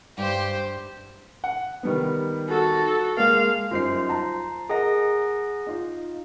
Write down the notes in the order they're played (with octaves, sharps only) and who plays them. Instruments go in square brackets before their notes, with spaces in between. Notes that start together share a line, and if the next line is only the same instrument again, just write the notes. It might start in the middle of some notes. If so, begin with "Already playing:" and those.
[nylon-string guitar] G2 [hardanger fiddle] G4 C5
[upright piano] F#5
D#3 G3 B3
[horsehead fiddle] F#4 A4
[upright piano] G#3 A#3 [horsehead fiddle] F5
[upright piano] F#2 G3 D#4 [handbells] F4 C5 C7
[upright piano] A5 A#5
[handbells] G#4 F#5 A#6 [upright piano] A#4 D#5 A#5
[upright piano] D#4 F4